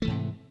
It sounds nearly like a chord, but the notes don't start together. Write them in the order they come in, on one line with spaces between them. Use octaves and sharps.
A3 E3 G#2 C3